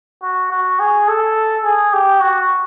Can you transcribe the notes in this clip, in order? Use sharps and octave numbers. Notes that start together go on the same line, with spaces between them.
F#4
F#4
G#4
A4
G#4
G4
F#4